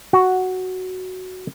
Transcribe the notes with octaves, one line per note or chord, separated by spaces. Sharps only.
F#4